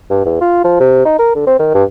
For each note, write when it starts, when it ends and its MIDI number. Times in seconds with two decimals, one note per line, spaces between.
0.10 0.22 43
0.25 0.38 40
0.41 0.63 65
0.64 0.79 53
0.80 1.05 48
1.05 1.15 63
1.19 1.30 70
1.35 1.43 50
1.47 1.57 60
1.59 1.69 51
1.74 1.84 43